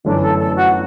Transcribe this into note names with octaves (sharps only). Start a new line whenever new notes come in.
G1 F#2 E3 A3 C#4 D4
A4
A4
F#4